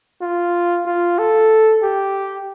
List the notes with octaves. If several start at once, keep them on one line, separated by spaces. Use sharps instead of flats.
F4
F4
A4
G4